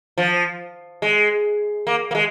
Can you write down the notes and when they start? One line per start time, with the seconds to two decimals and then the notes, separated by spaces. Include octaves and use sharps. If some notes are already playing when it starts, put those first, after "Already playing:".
0.18 F3
1.02 G#3
1.87 A#3
2.11 A#3
2.15 G#3